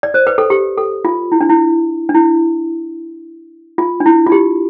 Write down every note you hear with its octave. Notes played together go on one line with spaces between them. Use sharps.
D5
C5
B4
A4
G4
A4
F4
E4
D4
E4
D4
E4
F4
D4
E4
F4
G4